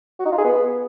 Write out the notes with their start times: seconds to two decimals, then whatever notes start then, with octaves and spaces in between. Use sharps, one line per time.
0.19 F#4
0.26 D#4
0.32 F4
0.38 G#4
0.44 B3